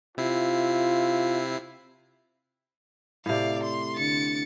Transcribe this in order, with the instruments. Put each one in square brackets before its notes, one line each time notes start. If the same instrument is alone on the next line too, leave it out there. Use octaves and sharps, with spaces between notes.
[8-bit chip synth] C3 E4 C7 [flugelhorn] F4
[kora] A2 C3 [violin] D5 F5
[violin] C6
[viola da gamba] D3 [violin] A6 C#7